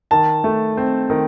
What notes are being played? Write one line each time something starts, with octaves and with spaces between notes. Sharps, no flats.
D#3 A5
A3
C4
D#3